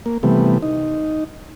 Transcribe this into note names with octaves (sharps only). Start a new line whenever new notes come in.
A#3
C3 E3 G3 A3 B3
D#4